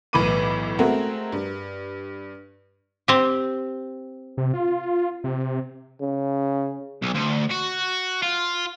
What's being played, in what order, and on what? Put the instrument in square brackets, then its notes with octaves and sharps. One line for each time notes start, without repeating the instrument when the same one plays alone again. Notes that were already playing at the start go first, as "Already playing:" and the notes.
[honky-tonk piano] B1 A2 E3 B5 D6 D#7
G#3 A3 C4 F#4 G#4 A#4
G2
[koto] C4 G4
[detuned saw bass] C3
F4
C3
[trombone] C#3
[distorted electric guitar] B1
D2
F#4
F4